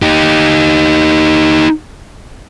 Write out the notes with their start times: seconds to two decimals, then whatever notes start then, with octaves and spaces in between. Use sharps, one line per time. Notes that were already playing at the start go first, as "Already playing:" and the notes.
0.02 D#4 G4